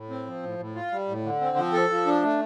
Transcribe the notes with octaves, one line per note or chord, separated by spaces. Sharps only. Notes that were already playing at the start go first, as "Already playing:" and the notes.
Already playing: A2
C4
F3
A2
A2
F4
G3
A2
D3
C4
F3
A4
F3
D4
A3